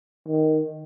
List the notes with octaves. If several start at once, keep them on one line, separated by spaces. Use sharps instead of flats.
D#3